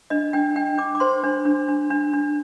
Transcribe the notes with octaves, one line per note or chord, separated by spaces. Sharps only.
D4 D#5
D4 G5
D4 G5
D4 D6
D6
C5 C6
D4
D4
D4
D4
D4